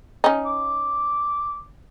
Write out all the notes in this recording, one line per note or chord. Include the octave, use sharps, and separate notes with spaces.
C#4 D#4
D6